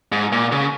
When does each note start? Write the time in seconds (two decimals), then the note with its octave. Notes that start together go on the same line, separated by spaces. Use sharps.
0.12 G#2
0.32 A#2
0.52 C#3